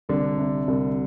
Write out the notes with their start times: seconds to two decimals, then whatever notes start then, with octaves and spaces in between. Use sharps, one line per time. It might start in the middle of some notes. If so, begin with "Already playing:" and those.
0.09 C2 D3
0.38 C3
0.67 C2